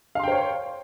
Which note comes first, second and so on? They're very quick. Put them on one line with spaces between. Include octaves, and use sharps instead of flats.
F5 C6 G5 C5 C#5